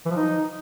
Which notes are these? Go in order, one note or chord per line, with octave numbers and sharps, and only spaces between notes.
E3
F3
D#4